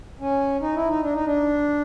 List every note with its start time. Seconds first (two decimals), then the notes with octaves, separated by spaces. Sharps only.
0.21 C#4
0.61 D#4
0.75 E4
0.88 D#4
1.02 D4
1.13 D#4
1.24 D4